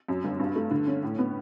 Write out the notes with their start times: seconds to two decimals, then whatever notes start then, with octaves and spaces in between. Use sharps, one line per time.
0.08 F#2
0.24 G1
0.39 G2
0.56 A3
0.71 D3
0.87 C#4
1.03 A2
1.18 B3